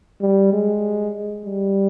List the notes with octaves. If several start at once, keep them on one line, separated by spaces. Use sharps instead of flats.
G3
G#3
G3